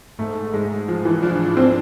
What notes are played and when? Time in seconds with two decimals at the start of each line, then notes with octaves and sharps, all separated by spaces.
0.19 G#2 A3
0.54 G#2 G#3
0.88 G#2 F3
1.05 E3
1.22 F3 D4
1.57 C4